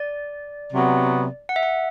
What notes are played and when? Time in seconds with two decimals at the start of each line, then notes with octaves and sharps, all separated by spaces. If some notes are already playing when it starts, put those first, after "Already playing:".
Already playing: D5
0.72 C3 F#3 B3
1.49 F#5
1.56 E5
1.63 F#5